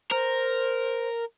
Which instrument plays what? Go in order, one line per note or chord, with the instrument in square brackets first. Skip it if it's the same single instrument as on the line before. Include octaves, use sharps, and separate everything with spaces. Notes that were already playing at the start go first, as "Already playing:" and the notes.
[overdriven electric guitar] A#4 [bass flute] C5